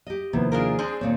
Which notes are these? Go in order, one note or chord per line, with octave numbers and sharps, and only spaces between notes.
G4 D#5
D#2 C3 D#3 F3 A#3 B3 E4
D4 F4 G#4 A#4
G#3 C4 D4
D#2 A#2 C4 C#5 D#5